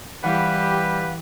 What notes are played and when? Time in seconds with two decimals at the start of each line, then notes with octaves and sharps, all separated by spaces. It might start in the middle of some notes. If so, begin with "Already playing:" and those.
0.24 E3 G3 G4 B4 F5 F#5